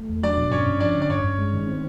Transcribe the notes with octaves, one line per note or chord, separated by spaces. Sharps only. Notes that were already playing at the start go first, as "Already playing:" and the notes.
Already playing: A3
E2
F#3 D4 D5
B2
G2 C#4 C#5
G2
F3 D4 D5
D3
D5
G2 C#4 C#5
G2
G#3
D#3
C4